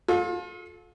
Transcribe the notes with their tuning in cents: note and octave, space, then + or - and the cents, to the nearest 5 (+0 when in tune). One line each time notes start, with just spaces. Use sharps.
F4 +35 A4 -30